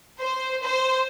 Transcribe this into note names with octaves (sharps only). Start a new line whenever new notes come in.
C5
C5